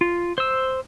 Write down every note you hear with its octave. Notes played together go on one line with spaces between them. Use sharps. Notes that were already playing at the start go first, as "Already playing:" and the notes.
F4
C5 E6